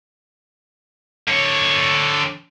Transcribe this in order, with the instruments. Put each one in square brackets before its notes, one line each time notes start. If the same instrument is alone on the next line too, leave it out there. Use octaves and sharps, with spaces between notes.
[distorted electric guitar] D3 C#5